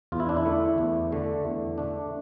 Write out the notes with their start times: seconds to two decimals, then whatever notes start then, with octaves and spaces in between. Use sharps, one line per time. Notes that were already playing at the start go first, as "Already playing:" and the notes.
0.12 E2 F4
0.20 E4
0.29 D4
0.37 E4
0.45 D3 A3 D4
0.78 E2
1.12 D3 A3 D4
1.44 E2
1.78 D3 A3 D4